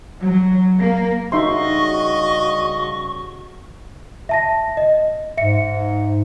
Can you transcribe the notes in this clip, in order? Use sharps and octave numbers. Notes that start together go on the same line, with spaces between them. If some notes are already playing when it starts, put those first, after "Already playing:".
F#3
A#3
G2 C#3 D#4 F#4 D#5 E5 C6 C#6
E5 A5 A#6
D#5
G#2 E5 C#7